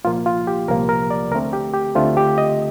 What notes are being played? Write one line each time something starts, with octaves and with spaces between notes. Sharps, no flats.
C2 A#2 F3 A#3 F4
F4
G4
C2 A#2 F3 A#3 A#4
A#4
D5
D2 D3 A3 C4 A#4
G4
G4
D2 D3 A3 C4 F4
G4
D#5